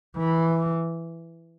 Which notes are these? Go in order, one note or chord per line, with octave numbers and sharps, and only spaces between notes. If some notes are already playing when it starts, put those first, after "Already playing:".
E3